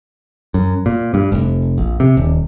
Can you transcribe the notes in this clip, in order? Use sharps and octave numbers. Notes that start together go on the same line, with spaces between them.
F#2
A#2
G2
F1
A#1
C3
D#1